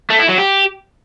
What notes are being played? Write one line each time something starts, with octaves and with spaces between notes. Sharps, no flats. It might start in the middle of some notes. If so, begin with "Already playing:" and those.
A3
E4
F#3
G4